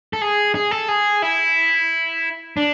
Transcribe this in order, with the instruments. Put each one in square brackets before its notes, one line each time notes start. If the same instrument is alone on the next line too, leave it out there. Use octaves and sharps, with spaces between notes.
[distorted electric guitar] A4
G#4
G#4
A4
G#4
E4
D4